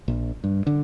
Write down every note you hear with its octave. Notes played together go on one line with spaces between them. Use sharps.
A#1
G2
D3